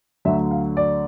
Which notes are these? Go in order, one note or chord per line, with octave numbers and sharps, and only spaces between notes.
D2 D3 F#3 E5
F5
D5